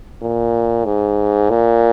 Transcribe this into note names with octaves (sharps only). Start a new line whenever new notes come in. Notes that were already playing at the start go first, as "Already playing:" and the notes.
A#2
G#2
A#2